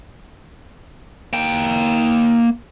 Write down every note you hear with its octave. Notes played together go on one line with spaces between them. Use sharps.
A#3 G5